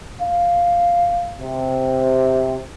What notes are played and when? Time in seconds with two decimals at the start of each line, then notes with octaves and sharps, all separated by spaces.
0.21 F5
1.39 C3